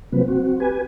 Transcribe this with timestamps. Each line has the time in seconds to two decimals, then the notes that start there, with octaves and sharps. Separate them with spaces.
0.12 C3 F3 F#3 A#3 C4 B4
0.28 C4 F#4
0.60 G4 B4 G#5